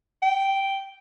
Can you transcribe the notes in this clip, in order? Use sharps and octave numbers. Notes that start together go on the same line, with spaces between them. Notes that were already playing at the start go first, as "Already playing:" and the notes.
G5